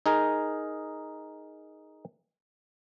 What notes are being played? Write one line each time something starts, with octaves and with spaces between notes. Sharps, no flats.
D#4 G#4 A#4